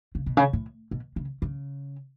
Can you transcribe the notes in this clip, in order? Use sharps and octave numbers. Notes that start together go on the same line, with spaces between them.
C#3
B2
C#3
A2
B2
C#3
C#3